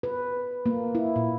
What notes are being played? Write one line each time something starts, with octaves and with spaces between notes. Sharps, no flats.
B4
A#3
E4
A#2